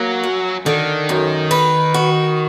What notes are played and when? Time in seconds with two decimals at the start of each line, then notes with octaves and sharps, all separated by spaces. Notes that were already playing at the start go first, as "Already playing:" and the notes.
Already playing: F#3 A#3
0.24 F#2
0.66 D3 D#3
1.09 F#2
1.51 B4
1.94 F#4